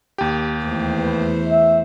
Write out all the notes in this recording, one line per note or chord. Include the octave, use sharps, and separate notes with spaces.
D#2 G4
E2 A3 C5
B4
E5